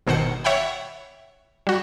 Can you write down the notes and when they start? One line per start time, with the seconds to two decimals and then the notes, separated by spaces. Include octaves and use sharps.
0.07 G1 B2 D#3 C5 F#5 C#7
0.44 C#5 E5 F#5 G5 B5
1.67 G3 F#4